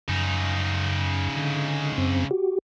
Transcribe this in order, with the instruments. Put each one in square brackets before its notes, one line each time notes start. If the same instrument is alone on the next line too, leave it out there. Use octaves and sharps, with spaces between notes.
[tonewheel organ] F#2 [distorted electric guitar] C#3 D#4
[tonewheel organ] D3
F#2 C4
F#4 G4